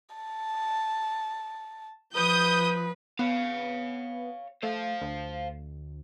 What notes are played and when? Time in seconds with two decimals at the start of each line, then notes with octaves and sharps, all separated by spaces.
0.16 A5
2.15 F3 B4 D#6 G6
3.19 B3 C#5 F5
4.63 A3 C5 F5
5.02 D2